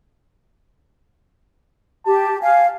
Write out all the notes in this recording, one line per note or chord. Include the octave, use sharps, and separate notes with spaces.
G4 A5
F5 G#5